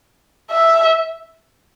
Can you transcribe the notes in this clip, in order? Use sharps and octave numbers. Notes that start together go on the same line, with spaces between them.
E5